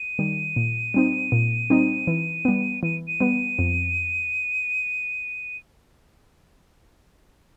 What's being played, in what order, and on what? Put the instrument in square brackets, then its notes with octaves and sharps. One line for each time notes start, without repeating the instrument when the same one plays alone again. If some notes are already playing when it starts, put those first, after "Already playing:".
Already playing: [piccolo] D#7
[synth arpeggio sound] D#3 G3
A#2
G3 C4 D#4
A#2
G3 C4 D#4
E3
G3 B3
[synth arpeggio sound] E3 [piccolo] D#7
[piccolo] D#7
[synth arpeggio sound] G3 B3
F2